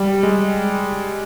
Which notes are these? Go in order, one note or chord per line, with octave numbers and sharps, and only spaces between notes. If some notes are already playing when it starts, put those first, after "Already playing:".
Already playing: G3
G#3